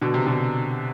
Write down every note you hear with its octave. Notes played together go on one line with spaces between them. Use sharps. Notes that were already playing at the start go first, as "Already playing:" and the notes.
B2 D3
C3
B2 D3